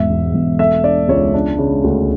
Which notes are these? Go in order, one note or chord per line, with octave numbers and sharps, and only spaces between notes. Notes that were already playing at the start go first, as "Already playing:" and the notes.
Already playing: E1 G#2 E5
E2
E1
A3 E5
D4 D5
C#2 C#5
D4
C#3
D2